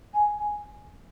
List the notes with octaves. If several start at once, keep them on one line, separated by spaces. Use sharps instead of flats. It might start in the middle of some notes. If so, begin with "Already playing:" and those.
G#5
G#5